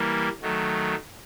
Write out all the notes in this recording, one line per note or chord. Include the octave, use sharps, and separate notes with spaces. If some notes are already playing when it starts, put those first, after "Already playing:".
Already playing: E3 G3 A#3
D#3 F#3 A3